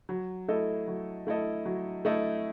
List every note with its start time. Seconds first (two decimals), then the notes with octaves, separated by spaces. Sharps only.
0.09 F#3
0.48 A3 E4 A4 D#5
0.87 F#3
1.27 A3 E4 A4 D#5
1.66 F#3
2.05 A3 E4 A4 D#5